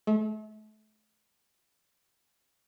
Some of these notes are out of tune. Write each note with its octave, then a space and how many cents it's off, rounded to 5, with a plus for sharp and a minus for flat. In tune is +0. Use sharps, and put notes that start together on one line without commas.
A3 -35